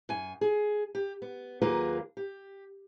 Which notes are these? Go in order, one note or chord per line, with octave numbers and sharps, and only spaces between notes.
F#2 G#5
G#4
G4
B3
D#2 F#3 A#3 F4 G#4 B4
G4